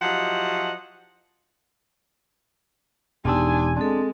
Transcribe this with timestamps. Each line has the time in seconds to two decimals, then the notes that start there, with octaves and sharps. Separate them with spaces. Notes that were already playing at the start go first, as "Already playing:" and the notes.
0.02 F3 F#3 E4 G4 D#5 F#5
3.25 E1 E2 D4 D#4 G4 G#5 C6 E6
3.77 G#3 C4 D4 A4